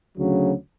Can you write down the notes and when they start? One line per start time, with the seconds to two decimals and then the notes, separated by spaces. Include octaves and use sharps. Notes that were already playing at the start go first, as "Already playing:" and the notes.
0.18 D2 C#3 F#3